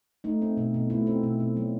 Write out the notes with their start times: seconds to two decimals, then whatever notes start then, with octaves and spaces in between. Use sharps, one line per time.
0.24 A3 D#4
0.42 C4
0.57 B2
0.74 B2
0.90 A3 E4
1.07 C4
1.23 B2
1.40 B2
1.57 F#3